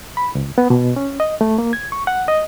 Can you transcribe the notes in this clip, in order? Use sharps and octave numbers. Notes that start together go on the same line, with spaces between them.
B5
C#2
B3
B2
C#4
D#5
A3
A#3
G#6
C#6
F#5
D#5